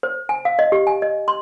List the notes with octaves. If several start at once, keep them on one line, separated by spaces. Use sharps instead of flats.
C5
G#5
F5
D#5
G4
G#5
D#5
C6